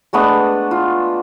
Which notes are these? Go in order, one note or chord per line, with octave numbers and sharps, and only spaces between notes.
G#3 A3 B3 D4
F4